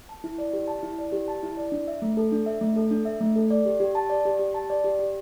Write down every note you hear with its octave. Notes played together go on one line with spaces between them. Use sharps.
A5
E4
D5
G4
A5
E4
D5
G4
A5
E4
D5
D4
E5
A3
A4
D4
E5
A3
A4
D4
E5
A3
A4
D5
G4
G4
A5
D5
G4
G4
A5
D5
G4
G4